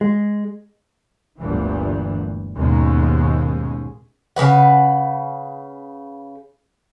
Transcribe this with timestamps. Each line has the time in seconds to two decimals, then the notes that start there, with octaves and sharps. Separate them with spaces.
0.01 G#3
1.38 G1 D2 G2 A#2 E3
2.55 G#1 D#2 B2 G#3 C#4
4.36 C#3 A#3 B4 F#5